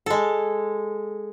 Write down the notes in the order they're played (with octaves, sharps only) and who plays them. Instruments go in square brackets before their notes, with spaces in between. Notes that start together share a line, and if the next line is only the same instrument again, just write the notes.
[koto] G#3 A4